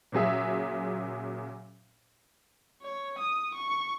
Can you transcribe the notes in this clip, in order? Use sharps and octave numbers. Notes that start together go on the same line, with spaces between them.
A#2 C#3 F#3 G#4 E5
C#5
D#6
C#6